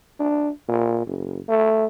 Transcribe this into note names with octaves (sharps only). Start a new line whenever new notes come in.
D4
A#2
F#1
A3